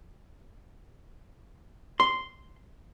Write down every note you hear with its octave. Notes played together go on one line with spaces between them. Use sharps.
C6